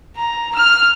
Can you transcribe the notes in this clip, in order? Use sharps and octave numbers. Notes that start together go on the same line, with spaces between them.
A#5
F6